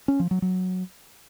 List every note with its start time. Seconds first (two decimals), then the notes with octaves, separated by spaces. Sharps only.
0.08 C#4
0.20 F3
0.31 F#3
0.42 F#3